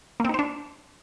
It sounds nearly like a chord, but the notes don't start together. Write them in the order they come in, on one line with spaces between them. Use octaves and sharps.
A#3 C4 D#4 C5 D4